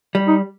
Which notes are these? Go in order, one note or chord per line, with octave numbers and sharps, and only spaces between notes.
G3
D#4